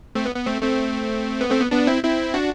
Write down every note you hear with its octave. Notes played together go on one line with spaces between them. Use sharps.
A3 C4
B3
B3
A3 C4
A3 C4
B3
A3 C4
B3
B3 D4
C4 E4
C4 E4
D4 F#4